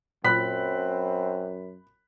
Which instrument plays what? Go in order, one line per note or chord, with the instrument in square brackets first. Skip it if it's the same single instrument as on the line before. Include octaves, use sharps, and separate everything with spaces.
[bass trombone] F#2 [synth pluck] A#2 F#3 [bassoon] C4 [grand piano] B5 F#6 B6